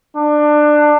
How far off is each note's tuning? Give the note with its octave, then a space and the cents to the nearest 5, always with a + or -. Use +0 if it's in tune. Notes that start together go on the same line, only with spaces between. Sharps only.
D4 +20